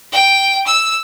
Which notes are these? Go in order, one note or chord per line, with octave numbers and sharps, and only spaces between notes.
G5
E6